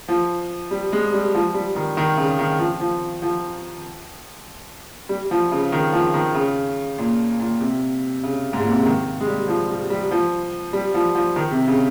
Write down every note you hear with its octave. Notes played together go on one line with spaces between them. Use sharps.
F3
G3
G#3
G3
F3
G3
D#3
D#3
C#3
D#3
F3
F3
F3
G3
F3
C#3
D#3
F3
D#3
C#3
A#2
A#2
C3
C#3
G#2
A#2
C3
C#3
D#3
G#3
G3
F3
G3
G3
F3
G3
F3
F3
D#3
C3
C#3